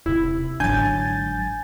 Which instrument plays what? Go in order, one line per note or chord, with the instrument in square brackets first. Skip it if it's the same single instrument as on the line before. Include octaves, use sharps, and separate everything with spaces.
[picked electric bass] D#1 C3 [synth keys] E4
[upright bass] G#1 D3 [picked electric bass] F#3 D4 [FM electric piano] G#5 [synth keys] G6 A6